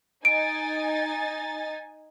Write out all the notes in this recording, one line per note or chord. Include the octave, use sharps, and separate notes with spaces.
D#4 G#5 A6 D7